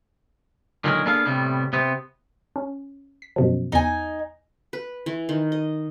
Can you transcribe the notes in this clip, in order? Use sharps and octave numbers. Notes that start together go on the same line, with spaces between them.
A#2 D3 D#3 F#3 G#3 A#4
A#3 B3 D4 G#4 A4 F5
A2 C3 G3 B3
C3 B3 C4
C#4
B6
F#2 B2 F3
E2 D#4 G#5 A6
B4
E3
D#3
D#5